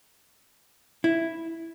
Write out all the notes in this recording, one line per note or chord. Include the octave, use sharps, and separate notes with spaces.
E4